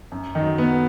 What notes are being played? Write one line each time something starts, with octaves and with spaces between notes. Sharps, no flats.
F#2
D#3 D#4
F#3
B3